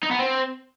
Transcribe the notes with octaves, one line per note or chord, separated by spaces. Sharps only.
D#4
B3
C4